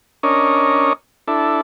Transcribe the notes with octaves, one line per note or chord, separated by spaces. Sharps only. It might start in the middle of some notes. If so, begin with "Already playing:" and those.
C#4 D4 A#4 C#5 D#5
D4 E4 A4